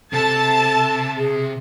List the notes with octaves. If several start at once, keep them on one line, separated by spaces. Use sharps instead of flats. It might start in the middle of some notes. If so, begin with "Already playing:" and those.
C3 A4 A5
G#4